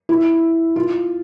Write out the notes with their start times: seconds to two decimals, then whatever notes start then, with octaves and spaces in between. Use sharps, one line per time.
0.09 E4
0.76 F4